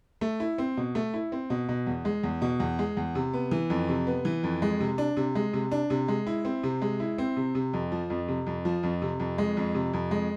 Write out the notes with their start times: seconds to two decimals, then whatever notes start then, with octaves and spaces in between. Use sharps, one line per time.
0.21 A3
0.40 E4
0.58 C4
0.77 B2
0.95 A3
1.14 E4
1.32 C4
1.50 B2
1.69 B2
1.87 E2
2.05 G#3
2.23 E2
2.42 B2
2.60 E2
2.79 G#3
2.97 E2
3.15 C3
3.33 B3
3.51 E3
3.70 F2
3.89 C3
4.07 B3
4.25 E3
4.43 F2
4.62 G#3
4.80 C3
4.98 D4
5.17 C3
5.35 G#3
5.53 C3
5.71 D4
5.90 C3
6.08 G#3
6.27 E4
6.45 C4
6.63 C3
6.82 G#3
7.00 E4
7.18 C4
7.36 C3
7.55 C3
7.73 F2
7.92 F3
8.10 F2
8.28 C3
8.46 F2
8.65 F3
8.83 F2
9.02 C3
9.20 F2
9.38 G#3
9.57 F2
9.75 C3
9.93 F2
10.11 G#3